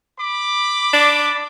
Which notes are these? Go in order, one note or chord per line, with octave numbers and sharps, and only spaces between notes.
B5 D6
D4